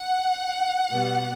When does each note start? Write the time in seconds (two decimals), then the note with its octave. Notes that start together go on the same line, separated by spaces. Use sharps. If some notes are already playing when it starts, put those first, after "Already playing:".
Already playing: F#5
0.89 B2 G3 B3